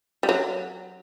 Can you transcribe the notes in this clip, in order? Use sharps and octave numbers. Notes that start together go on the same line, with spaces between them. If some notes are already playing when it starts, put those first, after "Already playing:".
G3
F#3